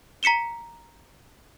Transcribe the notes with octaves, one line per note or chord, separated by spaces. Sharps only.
A#5 B6 C#7 E7 G7